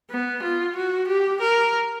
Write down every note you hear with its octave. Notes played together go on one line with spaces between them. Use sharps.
B3
F4
F#4
G4
A#4